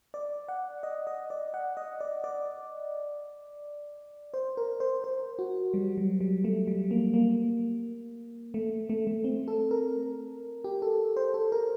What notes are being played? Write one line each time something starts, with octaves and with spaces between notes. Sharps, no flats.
D5
F#5
D#5
D#5
D5
F#5
D#5
D5
D5
C5
A#4
C5
C5
F#4
G3
F#3
G3
A3
G3
A#3
A#3
A3
A3
A3
C4
A4
A#4
G4
A4
C5
A4
A#4